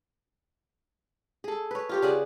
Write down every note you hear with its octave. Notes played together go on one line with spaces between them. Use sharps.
G#4 A4
B4 C#5
F4 G4 C#5
C#3 G#4 D5 F#5